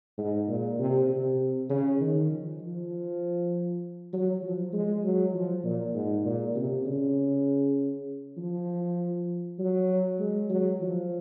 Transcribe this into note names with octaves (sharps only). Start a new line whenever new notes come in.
G#2
A#2
C3
C3
C#3
D#3
F3
F3
F#3
F3
G#3
F#3
F3
A#2
G#2
A#2
C3
C#3
F3
F#3
G#3
F#3
F3